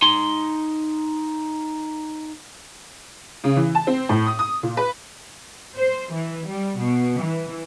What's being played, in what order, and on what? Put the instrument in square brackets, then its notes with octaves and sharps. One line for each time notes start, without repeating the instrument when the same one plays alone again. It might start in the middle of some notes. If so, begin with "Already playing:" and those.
[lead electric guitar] D#4 C6
[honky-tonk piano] C#3
E3
A5
C4
A2
D#6
D#6
A#2
B4
[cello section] C5
E3
G3
B2
E3